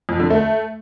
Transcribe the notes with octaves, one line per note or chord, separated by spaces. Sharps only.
F2
D3
A3